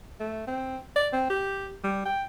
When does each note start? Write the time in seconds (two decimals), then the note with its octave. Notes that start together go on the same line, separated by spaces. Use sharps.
0.20 A3
0.47 C4
0.96 D5
1.13 C4
1.30 G4
1.84 G3
2.05 G5